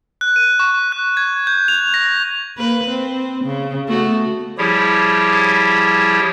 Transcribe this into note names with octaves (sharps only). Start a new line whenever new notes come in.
F#6
D#7
C#6
F#6
G#6
G6
F7
A#6
A#3 B4
C4
C#3
A3 B3 F#4
F3 G3 E4 G4 G#4 C#5